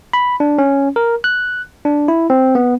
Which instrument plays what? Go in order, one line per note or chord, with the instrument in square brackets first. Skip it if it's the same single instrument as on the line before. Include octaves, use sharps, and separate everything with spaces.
[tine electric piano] B5
D4
C#4
A#4
F#6
D4
E4
C4
B3